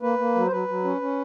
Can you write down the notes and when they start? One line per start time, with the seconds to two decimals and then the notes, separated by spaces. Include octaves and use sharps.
0.02 A#3 B4
0.18 A#3
0.35 F#3
0.47 C5
0.52 F#3 B4
0.68 F#3
0.84 C#4
1.01 C#4